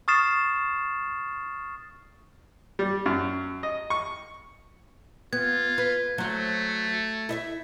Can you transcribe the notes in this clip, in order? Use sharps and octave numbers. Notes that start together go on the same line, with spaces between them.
C#6 D#6 F6 A6 C7 E7
G3
F#2
D#5
C#6
B3 F4 G#6
B4
F#3 A3 C5
E4 D#5 E5